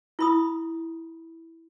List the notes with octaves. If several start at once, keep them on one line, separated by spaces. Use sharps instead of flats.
E4 B5 D#6